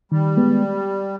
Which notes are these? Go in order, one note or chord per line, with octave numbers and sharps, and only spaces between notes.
D#3 G3
G#3 B3